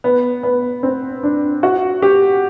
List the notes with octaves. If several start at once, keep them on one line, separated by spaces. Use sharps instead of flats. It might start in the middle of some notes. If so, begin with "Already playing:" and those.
B3
B3
C4
D4
F#4
G4